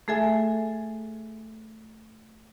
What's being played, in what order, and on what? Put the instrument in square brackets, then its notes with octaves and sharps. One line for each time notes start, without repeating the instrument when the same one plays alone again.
[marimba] A3 G#4 A4 E5 G#5